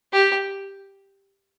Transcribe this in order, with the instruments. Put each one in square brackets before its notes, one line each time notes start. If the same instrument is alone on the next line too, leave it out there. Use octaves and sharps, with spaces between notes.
[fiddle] G4